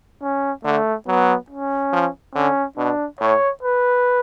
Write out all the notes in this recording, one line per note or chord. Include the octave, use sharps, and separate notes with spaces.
C#4
D3 A3
F#3 B3
C#4
F3
D3 C#4
B2 D4
A2 C#5
B4